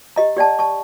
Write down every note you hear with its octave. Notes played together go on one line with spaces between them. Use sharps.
G4 D#5 A#5
G4 D5 G5 A5
A5 C#6